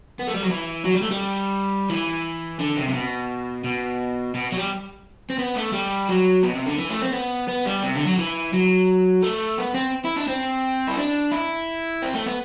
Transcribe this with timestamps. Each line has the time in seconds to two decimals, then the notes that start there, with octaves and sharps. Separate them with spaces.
0.19 B3
0.28 A3
0.34 G3
0.43 F#3
0.50 E3
0.85 F#3
0.94 G3
1.02 A3
1.11 G3
1.90 E3
2.60 D3
2.77 C3
2.89 C3
2.94 B2
3.64 B2
4.35 B2
4.52 F#3
4.57 G3
5.30 C4
5.39 B3
5.56 A3
5.73 G3
6.09 F#3
6.43 B2
6.55 C3
6.67 D3
6.79 E3
6.90 A3
7.02 C4
7.13 B3
7.48 B3
7.66 G3
7.83 C3
7.95 D3
8.07 F#3
8.18 E3
8.53 F#3
9.22 A3
9.58 B3
9.75 C4
10.05 E4
10.16 D4
10.28 C4
10.88 E4
10.98 D4
11.32 E4
12.02 C4
12.14 A3
12.26 B3